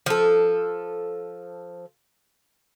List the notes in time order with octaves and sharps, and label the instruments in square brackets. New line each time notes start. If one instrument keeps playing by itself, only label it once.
[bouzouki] F3 A4